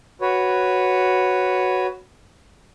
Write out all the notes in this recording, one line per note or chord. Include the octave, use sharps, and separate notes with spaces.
F#4 B4 C#5